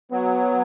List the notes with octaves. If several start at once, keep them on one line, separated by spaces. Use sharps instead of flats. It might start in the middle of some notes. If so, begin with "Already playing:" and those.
F#3 B3